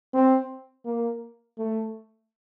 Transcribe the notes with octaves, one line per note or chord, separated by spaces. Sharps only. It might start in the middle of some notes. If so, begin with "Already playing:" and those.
C4
A#3
A3